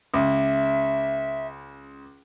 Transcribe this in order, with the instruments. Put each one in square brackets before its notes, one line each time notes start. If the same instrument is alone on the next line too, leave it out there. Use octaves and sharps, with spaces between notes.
[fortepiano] C#2 [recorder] E5